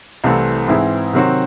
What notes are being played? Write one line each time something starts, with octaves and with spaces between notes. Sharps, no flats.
C2 C3 E3 A3 C4
G#2 E3 C4 E4 G#4
C3 D#3 F#3 C4 F#4